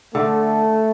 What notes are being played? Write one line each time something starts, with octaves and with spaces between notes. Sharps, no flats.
D3 A3